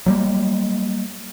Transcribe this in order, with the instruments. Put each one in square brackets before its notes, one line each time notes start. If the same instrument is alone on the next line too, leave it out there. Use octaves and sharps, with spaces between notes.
[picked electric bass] F#3 G3 A#3